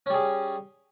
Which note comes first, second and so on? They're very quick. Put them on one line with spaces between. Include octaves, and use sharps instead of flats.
C#4 G3 G#4